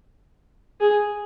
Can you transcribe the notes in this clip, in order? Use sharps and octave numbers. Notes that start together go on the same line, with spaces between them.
G#4